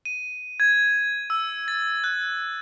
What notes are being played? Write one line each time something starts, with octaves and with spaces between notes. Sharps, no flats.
D#7
G#6
E6
A6
F#6